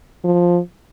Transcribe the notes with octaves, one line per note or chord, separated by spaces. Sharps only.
F3